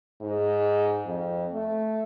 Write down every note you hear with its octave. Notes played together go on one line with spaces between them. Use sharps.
G#2
F2
A3